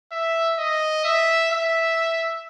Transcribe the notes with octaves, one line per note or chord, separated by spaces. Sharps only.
E5
D#5
E5
E5